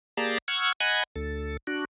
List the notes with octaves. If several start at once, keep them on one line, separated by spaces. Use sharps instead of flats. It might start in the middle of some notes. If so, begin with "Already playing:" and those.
A#3 G4 G#4 D5 A5 A#5
F#5 C#6 E6 F6 G#6
D#5 F#5 G#5 B5 F#6 G#6
D2 A4
D4 F#4